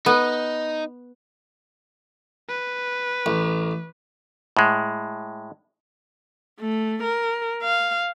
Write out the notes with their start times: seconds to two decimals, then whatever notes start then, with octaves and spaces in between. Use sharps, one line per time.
0.06 B3 D#4
2.49 B4
3.26 A1
4.57 A2 G#3
6.60 A3
7.03 A#4
7.63 F5